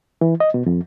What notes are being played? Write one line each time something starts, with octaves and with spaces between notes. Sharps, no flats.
E3
D#5
B2
F2